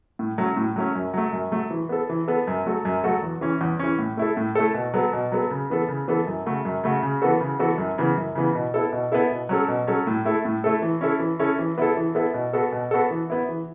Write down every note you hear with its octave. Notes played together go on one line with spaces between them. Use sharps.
A2
F#3 A3 C#4
A2
F#3 A3 C#4
F#2
F#3 A3
F#2
F#3 A3
E3
B3 A4
E3
B3 A4
F#2
F#3 A3 F#4 A4
F#2
F#3 A3 F#4 A4
E2
E3 C#4
E2
E3 C#4
A2
A3 E4 A4
A2
A3 E4 A4
B2
F#3 B3 A4
B2
F#3 B3 A4
C#3
E3 B3 A4
C#3
E3 B3 A4
F#2
C#3 A3 F#4
F#2
C#3 A3 F#4
C#3
E3 B3 F#4 A4
C#3
E3 B3 F#4 A4
F#2
C#3 E3 B3
F#2
C#3 E3 B3
B2
B3 E4 A4
B2
B3 E4 A4
B2
F#3 C#4 A4
B2
F#3 C#4 A4
A2
A3 E4 A4
A2
A3 E4 A4
E3
C#4 E4 A4
E3
C#4 E4 A4
E3
B3 E4 A4
E3
B3 E4 A4
B2
B3 F#4 A4
B2
B3 F#4 A4
E3
B3 E4
E3